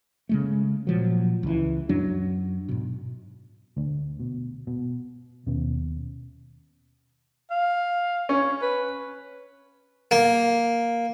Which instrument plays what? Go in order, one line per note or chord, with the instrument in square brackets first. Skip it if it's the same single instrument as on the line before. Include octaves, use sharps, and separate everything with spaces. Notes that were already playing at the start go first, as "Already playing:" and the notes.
[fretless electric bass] C#3 G#3 A3
A#2 F3 F#3
C#2 E3
F#2 F#3 D4
G#2 B2
[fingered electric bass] D2
B2
B2
D#2 B2 C#4
[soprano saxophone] F5
[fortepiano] C#4
[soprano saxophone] B4
[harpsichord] A#3